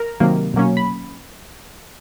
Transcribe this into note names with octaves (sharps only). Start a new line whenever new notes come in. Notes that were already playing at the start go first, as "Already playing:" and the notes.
Already playing: A#4 A#5
C3 D#3 F#3 A#3
B2 F#3 A#3 C#4
B5